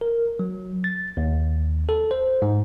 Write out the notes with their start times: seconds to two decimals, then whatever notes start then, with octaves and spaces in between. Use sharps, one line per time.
0.01 A#4
0.39 F#3
0.84 A6
1.17 D#2
1.89 A4
2.11 C5
2.42 G#2